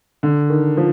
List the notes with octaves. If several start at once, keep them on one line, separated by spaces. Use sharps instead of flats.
D3
D#3
F3